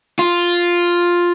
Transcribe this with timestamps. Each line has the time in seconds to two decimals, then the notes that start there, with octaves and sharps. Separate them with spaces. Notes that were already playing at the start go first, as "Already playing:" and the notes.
0.19 F4